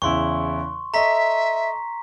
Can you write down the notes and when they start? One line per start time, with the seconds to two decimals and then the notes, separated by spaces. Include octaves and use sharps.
0.02 E2 C#3 E4 C6 C#6
0.94 A4 D#5 E5 A#5 C#6 B6